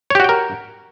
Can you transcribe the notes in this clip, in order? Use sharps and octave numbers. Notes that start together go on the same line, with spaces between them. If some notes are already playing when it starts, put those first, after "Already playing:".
F#4 G4 A#4 C#5 G5